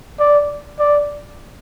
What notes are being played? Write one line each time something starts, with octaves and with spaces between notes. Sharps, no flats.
D5
D5